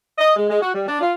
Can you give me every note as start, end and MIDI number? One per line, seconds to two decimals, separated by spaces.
0.18 0.32 75
0.36 0.47 56
0.50 0.61 56
0.61 0.71 66
0.74 0.86 55
0.87 1.00 62
1.01 1.12 65